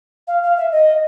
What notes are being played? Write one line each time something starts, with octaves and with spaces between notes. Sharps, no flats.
F5
F5
E5
D#5